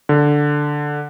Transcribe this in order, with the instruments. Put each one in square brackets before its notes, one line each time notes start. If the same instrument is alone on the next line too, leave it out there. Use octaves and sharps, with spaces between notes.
[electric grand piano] D3